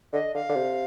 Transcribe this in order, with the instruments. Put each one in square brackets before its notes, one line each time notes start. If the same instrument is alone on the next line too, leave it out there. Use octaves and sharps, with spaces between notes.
[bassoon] D3 [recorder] D#5
[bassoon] D3 [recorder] F5
[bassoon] D3
C3